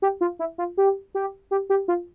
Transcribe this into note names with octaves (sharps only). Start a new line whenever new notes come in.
G4
F4
E4
F4
G4
G4
G4
G4
F4